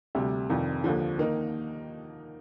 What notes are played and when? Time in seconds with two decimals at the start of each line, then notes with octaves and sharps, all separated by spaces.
0.15 D2 C3 G3
0.49 F1 F2 D#3
0.84 D#2 D3 F3
1.18 D#3 A#3 D#4